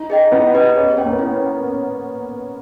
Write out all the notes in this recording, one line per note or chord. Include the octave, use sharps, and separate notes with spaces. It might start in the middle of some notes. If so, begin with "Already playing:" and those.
Already playing: D#4
G#4 D#5 G5
B3 E4
G4 B4 D#5
C#4 G#4
B3 C#5 G5
A#3
B3
C#4 E4